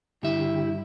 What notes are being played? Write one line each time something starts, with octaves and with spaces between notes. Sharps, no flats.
G2 D3 E4 G4 E5